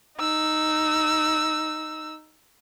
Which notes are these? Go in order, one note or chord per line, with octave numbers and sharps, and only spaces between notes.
D#4 E6